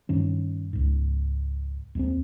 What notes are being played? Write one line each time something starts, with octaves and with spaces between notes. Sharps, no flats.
G2 D#3 C#4
C#2 G#2
D#2 G#3 C4